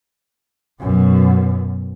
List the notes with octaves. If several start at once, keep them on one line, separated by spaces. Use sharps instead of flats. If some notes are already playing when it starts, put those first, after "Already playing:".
F#2 B2